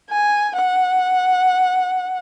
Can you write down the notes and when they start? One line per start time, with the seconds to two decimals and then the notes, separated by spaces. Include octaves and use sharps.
0.10 G#5
0.55 F#5